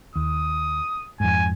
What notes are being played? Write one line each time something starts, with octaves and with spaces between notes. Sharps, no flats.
D#2 D#6
F2 G#2 G#5